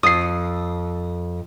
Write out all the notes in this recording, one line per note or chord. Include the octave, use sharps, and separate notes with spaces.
F2 D#6 C7